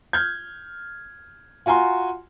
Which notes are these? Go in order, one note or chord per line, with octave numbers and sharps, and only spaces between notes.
F6 G6 G#6
F4 F#4 G#5 A#5 C6